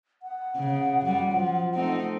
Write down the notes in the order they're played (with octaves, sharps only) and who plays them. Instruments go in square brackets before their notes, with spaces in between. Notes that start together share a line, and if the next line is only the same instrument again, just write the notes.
[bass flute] F#5
[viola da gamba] C#3
F#2 G3
F3
A3 C4 D#4